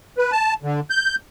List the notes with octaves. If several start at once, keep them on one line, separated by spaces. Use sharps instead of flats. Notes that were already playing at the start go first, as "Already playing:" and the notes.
B4
A5
D3
G6